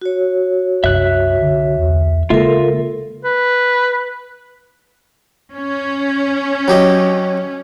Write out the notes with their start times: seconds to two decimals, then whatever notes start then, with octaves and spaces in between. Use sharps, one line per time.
0.01 F#4 C#5
0.84 C2 F#2 D4 E5 F#6
1.42 D3
1.79 E2
2.30 C#3 G#3 A#3 F4 A4 A#4 E5
3.25 B4
5.53 C#4
6.68 F#3 G4 D#5